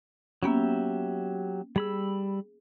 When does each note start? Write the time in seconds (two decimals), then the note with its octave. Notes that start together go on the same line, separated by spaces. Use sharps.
0.43 F#3 A#3 B3 C#4 G4 E5
1.76 G3 G#4 B5 E6